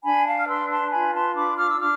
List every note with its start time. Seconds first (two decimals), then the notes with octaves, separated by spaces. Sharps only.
0.03 D4 G#5 B5
0.26 F5 A5
0.38 F6
0.48 B4 C6 E6
0.70 A5 C6
0.91 F4 G#5 B5
1.13 A5 C6
1.35 D4 B5 D6
1.57 D6 F6
1.70 E6
1.79 D4 D6 F6